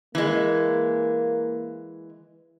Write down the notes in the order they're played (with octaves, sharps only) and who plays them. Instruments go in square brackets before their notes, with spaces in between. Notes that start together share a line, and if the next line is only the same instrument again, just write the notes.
[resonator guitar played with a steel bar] E3 G#3 [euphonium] A#3